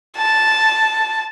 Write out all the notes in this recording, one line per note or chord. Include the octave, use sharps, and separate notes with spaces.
A5